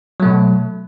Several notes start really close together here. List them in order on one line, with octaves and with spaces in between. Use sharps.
F#3 A3 B2